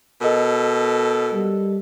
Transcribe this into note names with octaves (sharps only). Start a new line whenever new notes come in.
B2 A4 A#4 D#5
G3